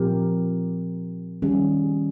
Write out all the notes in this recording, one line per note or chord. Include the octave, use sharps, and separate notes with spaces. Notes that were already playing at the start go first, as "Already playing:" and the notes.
Already playing: A#2 F3 C4 G4 A#4
D#3 G3 C#4 G#4